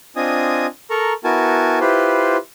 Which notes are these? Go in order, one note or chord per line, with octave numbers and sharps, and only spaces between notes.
C4 D4 F4 D#5 G#5 D#6
A4 A#4 A#5 C#6
B3 E4 F#4 A#4 G#5 A5
E4 F4 G4 B4 C5